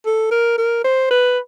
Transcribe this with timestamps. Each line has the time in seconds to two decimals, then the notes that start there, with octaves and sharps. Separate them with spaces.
0.06 A4
0.31 A#4
0.58 A#4
0.84 C5
1.11 B4